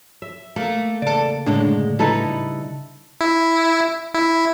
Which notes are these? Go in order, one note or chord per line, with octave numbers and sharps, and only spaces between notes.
E5
A3 A#3
E2 C#3 A4 D5
F#2 A2 D3 G#3 D4
G3 D#4 E4 A4 B4
E4
E4